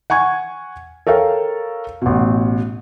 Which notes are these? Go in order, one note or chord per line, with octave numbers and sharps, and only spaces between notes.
F#5 G#5 C#6 G#6
A4 A#4 C#5 F5 G5
A1 B2